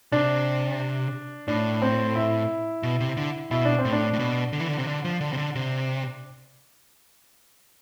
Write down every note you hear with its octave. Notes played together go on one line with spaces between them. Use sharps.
C3 D4
A2 D4
C4
E4
B2
C3
D3
B2 E4
D4
C4
A2
D4
A2
B2
D3
E3
D3
C3
D3
F3
D3
C3
D3
C3